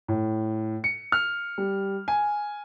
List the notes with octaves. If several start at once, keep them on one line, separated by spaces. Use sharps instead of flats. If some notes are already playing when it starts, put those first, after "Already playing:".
A2
C#7
F6
G3
G#5